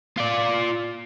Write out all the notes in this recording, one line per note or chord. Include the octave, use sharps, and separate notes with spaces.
F4 D5